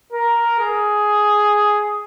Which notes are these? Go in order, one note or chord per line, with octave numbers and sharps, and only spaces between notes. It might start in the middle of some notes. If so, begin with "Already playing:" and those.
A#4
G#4